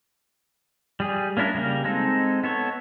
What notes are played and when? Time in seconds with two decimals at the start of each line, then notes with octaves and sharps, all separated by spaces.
1.00 G3 G#4
1.37 A#3 C#4 D4 E4 A#4
1.54 C#3 G3 A#3 A#4
1.84 G#3 C4 D#4 A4
2.44 B3 A4 C#5